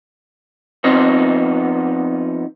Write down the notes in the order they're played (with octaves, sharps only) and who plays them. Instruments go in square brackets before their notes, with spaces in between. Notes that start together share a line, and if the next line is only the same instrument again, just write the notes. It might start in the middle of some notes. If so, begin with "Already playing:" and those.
[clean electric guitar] F2 F3 B3 C4 D#4 C5